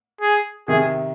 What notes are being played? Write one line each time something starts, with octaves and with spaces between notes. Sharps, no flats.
G#4
C3 D#3 G#4